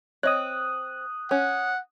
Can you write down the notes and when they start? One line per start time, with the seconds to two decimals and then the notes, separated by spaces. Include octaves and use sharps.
0.23 C4 C#5 D#5 D#6 F#6
1.31 C#4 F#5